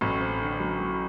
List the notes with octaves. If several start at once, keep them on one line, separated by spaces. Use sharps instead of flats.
A1 A2 F#3
C4
D3
F#3
F#3